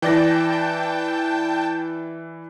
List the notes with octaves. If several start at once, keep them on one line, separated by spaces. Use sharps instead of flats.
E3 D5 G5 A5 G6 A#6